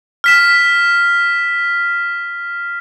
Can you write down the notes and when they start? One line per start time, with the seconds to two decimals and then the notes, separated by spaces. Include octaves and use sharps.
0.24 F6 B6 E7